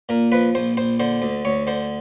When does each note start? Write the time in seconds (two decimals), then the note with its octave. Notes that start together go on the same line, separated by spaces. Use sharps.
0.09 A#2 A#4
0.32 F3 B4
0.55 A#1 C5
0.77 A#1 C5
1.00 D3 C5
1.22 D2
1.45 D2 C#5
1.67 D3 C5